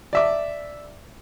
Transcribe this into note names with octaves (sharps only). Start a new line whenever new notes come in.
D5 E5 D6